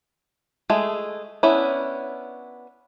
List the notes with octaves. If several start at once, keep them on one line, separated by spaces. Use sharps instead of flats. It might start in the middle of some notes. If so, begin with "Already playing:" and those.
G#3 A3 G#4
B3 C#4 D4 E4